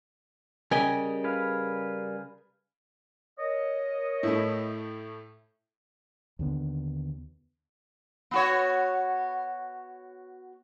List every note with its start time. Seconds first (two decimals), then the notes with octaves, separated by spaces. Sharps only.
0.71 C#3 G3 G4 A#4 D#5 G#5
1.24 G#4 B4 F5
3.39 A#4 C#5 D#5
4.23 A2 A3 E4
6.39 D#2 D3 B3
8.31 B3 F#4 C#5